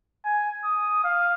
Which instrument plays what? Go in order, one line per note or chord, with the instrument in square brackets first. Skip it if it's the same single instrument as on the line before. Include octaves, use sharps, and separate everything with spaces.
[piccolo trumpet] G#5
D#6
F5